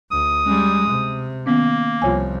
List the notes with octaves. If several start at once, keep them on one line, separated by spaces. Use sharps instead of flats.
D2 D#6
G3 G#3 C#4
C3
D#3 A#3 B3 C#4
C2 F3 F4 C#5 G#5